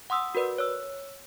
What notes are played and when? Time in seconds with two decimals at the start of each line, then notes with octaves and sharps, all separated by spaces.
0.10 F#5 C6 D#6 E6
0.35 F#4 A#4 B4 D5
0.58 C#5 E6